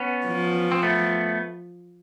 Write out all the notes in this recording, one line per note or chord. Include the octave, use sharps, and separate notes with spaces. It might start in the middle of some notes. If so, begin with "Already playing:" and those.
Already playing: B3 C#4
F3
C4
A3 B3